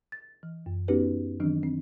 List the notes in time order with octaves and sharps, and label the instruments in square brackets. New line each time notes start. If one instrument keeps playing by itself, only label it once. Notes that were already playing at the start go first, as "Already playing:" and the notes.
[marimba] A6
E3
F#2
B3 C#4 D#4 F#4 G4 B4
D#3 E3 F#3 C4 D4
C4